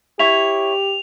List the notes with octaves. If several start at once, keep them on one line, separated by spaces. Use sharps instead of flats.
E4 G4 C#5 F7